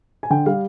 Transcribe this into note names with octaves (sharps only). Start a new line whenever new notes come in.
G#5
D3 G5
G3 F5